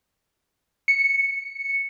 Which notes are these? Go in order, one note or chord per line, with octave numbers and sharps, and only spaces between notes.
C#7